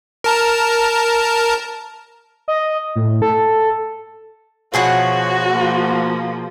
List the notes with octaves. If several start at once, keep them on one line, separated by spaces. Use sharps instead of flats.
A#4 A5 A#5
D#5
A2
A4
B2 F3 F#4 G#4 C#5 F#5
F3 A#3